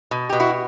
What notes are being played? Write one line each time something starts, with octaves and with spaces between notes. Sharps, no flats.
B2
B2 G4
E4 F#4